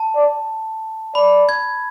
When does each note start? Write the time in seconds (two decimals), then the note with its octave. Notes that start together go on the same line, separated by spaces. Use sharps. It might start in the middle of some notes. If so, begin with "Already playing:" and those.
Already playing: A5
0.15 D5
1.15 D5 B5
1.49 G#6